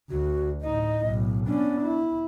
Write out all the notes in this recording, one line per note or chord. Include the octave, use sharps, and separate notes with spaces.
D2 F#4
A1 D#4 D#5
B1 A2
B3 C#4 D4
E4